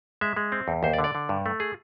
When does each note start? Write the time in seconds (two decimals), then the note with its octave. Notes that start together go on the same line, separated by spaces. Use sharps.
0.21 G#3 E5
0.37 G#3
0.52 C4
0.68 E2
0.83 D#2 C5
0.94 D5
0.99 D3
1.04 D5
1.15 D3
1.29 G2
1.46 A3
1.60 G#4